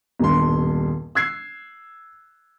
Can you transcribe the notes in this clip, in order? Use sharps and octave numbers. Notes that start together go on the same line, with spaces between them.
D#1 B1 G2 C6
E6 F#6 G#6 C7